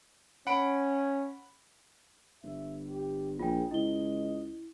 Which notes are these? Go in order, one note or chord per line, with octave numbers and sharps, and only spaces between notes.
C#4 F#5 B5 D7
G1 E5
G4
A#1 F4 G#4 G5
C#2 E4 D#5 G7